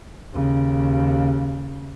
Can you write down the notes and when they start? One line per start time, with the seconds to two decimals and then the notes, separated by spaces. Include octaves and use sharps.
0.34 D#2 C#3